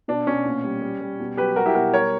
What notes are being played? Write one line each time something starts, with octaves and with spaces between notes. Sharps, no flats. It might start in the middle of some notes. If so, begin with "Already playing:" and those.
B2 D4
B2 C#4
A#2
G3
G3
G3
B2
F#3 G4 B4
G3 F#4 A#4
E4 G4
B2 F#4 A#4
G3 A#4 C#5